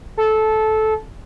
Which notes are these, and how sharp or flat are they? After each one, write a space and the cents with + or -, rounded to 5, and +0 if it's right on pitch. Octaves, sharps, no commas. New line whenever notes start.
A4 -15